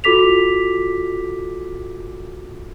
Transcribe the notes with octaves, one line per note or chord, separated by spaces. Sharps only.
F4 F#4 A4 D6 B6 F7